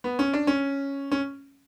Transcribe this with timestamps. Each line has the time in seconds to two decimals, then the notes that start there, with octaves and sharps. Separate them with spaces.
0.04 B3
0.19 C#4
0.33 D4
0.47 C#4
1.12 C#4